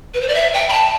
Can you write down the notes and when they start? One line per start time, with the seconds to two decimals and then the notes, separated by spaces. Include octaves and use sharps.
0.14 B4
0.21 C5
0.28 D5
0.35 E5
0.54 G5
0.69 B5
0.73 A5